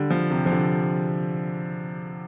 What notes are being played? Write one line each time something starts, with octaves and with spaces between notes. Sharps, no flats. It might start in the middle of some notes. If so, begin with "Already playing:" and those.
Already playing: D3 G3
F3
C3
F3
D3